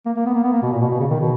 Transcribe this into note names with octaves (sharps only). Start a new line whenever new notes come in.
A#3
A#3
B3
A#3
B3
A#3
B2
A#2
B2
B2
C#3
D#3
B2